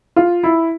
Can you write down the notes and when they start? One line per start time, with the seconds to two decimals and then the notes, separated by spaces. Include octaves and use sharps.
0.16 F4
0.43 E4